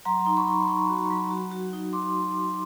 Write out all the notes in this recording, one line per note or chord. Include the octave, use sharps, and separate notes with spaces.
F#3 A#5 C6
D#4
B5 C#6
D#4
D#4 B5 C#6
F#4
F#3
F#4
F#4
D#4
C6 D6